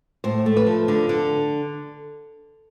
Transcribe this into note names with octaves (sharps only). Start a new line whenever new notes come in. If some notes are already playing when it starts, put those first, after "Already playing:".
A2 C5
A3
B4
F3
D3
D3